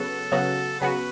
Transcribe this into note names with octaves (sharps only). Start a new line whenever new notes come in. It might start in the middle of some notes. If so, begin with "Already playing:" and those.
Already playing: C#3 F#3 B3 F#4 A4
C#3 F#3 B3 F#4
C#3 F#3 B3 F#4 B4